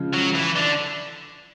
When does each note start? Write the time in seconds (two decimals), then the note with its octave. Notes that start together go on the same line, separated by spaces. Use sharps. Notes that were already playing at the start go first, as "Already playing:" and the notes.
Already playing: C#3 F3 G#3
0.13 F#3
0.35 E3
0.56 D3